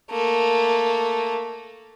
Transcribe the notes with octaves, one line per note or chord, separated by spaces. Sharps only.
A3 A#3